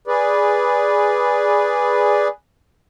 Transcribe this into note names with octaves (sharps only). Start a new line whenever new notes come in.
G#4 B4 D5